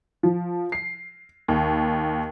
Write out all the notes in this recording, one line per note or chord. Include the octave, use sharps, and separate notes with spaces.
F3
C7
D#2